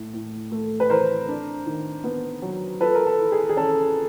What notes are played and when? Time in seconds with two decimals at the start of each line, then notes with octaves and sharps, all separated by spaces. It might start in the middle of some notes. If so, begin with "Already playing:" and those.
Already playing: A2
0.13 A2
0.51 A3
0.80 B4
0.89 E3 A#4 C5
1.29 D4
1.66 D#3
2.04 B3
2.42 F#3
2.80 F4 A4 B4
2.95 A#4
3.07 A4
3.18 E3
3.32 G#4
3.49 G#4
3.56 C#4 A4